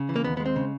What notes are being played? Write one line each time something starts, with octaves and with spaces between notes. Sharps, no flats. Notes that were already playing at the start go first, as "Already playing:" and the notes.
Already playing: C#3
E3
A#3
D#2 B3
G#3 B3
C4
C#3